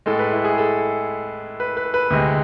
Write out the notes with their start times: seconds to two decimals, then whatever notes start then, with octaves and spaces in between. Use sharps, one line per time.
0.06 A2 G#3 A4
0.19 B4
0.32 E4
0.44 G#4
0.58 A4
1.60 B4
1.77 B4
1.94 B4
2.10 D2 C3 G#3